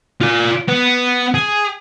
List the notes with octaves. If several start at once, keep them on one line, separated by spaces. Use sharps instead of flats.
F4 D5
B3
G#4